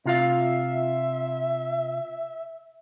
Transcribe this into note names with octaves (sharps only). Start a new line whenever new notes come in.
C3 F4 E5 F5